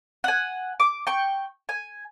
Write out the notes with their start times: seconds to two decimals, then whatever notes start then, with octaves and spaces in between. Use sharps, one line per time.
0.24 F#5 G#5
0.80 D6
1.07 G5 C#6
1.69 G#5